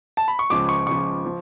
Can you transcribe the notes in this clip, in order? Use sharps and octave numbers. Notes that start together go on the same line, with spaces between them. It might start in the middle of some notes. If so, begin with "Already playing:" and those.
A5
B5
C#6
C#2 C#3 F3 D6
C#6
C#2 C#3 F3 C#6
F3